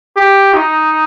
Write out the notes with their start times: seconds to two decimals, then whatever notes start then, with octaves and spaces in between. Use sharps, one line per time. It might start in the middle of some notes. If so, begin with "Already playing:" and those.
0.16 G4
0.54 D#4